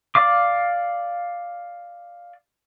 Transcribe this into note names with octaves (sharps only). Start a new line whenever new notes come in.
D5 F5 D6